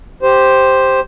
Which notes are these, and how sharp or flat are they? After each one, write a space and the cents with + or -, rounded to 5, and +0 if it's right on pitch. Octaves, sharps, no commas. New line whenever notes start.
G4 +0 C5 +0